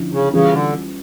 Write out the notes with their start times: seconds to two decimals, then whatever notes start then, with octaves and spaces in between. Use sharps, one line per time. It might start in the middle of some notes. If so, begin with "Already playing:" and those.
Already playing: D3 F3 C#4 E4
0.13 C#3
0.33 C#3 E3 G3 C#4 F4
0.53 D3